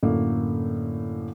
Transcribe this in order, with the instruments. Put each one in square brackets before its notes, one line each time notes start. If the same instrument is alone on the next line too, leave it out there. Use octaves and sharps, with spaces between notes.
[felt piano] F#2 A2 D3 A3 A#3